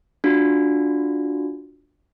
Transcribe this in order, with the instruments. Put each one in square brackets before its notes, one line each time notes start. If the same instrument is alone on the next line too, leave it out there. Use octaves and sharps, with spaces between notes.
[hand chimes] D4 F4 F#4